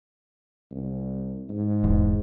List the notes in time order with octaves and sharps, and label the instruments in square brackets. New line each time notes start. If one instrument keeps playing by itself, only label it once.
[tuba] C2
G#2
[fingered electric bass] D#1 E2